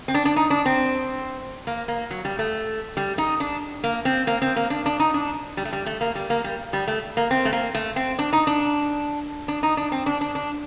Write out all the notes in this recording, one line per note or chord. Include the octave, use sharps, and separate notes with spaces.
C4
D4
D4
D#4
D4
C4
A#3
A#3
F#3
G3
A3
G3
D#4
D4
A#3
C4
A#3
C4
A#3
D4
D4
D#4
D4
G3
A3
G3
A3
A#3
G3
A#3
G3
G3
A3
A#3
C4
A3
A#3
A3
C4
D4
D#4
D4
D4
D#4
D4
C4
D4
D4
D4